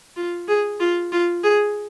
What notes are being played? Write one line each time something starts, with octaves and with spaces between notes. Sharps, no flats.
F4
G#4
F4
F4
G#4